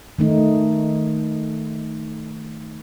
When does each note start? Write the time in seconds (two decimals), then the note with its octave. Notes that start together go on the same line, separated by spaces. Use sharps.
0.19 D#3 A3 D#4